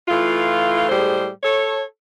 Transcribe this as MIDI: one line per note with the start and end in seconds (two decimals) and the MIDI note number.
0.07 0.85 52
0.07 0.85 57
0.07 0.85 65
0.89 1.27 45
0.89 1.27 55
0.89 1.27 56
0.89 1.27 68
0.89 1.27 72
1.43 1.82 69
1.43 1.82 73